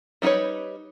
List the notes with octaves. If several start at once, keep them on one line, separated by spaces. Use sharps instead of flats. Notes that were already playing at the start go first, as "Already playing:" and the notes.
G3 D#4 F#4 B4 C#5